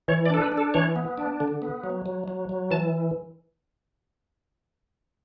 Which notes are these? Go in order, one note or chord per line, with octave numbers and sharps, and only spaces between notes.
E3 C#5
D5
D4 A4
B4
D4
A4
E3 C#5
B3
D4
D3
B3
F#3
F#3
F#3
F#3
E3 A5